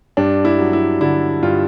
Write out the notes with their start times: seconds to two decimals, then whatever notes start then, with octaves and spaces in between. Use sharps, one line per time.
0.17 G2 D4
0.45 E4
0.59 F#3
0.73 E4
1.01 D3 E4
1.43 G2 F4